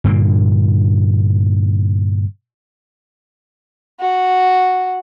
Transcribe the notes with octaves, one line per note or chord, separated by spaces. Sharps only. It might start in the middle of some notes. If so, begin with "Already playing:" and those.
G2 A#2 D3 A#3
F#4